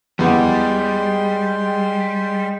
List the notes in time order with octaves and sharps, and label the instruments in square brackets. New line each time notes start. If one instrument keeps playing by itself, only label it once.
[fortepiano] E2 B3 F#5 [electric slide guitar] G3 [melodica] G#3 G5 C6